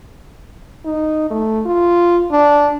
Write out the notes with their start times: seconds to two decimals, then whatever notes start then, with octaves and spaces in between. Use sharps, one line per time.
0.85 D#4
1.30 A3
1.66 F4
2.31 D4